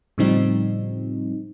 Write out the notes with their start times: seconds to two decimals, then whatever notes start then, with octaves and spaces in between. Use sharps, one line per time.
0.18 A2 C#3 F3 G3 C4 D#4